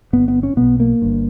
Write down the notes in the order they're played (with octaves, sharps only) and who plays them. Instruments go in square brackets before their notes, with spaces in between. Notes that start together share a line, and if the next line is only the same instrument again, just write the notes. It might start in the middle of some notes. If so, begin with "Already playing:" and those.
[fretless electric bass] G1 G2 B3
B3
C#4
B1 B2 B3
A#3
G1 G2